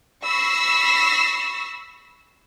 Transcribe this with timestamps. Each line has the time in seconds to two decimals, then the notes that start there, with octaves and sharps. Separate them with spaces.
0.24 B5 C#6 E6 A#6 C7